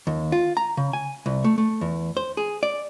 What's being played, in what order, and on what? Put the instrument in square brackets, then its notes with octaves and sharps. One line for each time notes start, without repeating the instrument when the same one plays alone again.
[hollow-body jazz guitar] D#2
F4
A#5
C#3
G#5
C2
A3
A3
E2
C5
G#4
D5